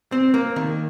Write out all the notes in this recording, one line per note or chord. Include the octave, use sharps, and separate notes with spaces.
C4
A#3
D#3